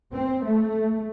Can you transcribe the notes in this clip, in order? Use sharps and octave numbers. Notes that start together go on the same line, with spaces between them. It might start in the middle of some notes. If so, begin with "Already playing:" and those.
C4
A3